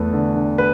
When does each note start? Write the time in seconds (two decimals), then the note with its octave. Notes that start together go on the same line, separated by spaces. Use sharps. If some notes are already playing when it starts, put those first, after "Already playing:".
Already playing: E2 A3 B4
0.13 D3
0.35 D3
0.58 B4